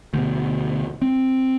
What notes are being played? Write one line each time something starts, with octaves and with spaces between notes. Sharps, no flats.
D2 B2
C4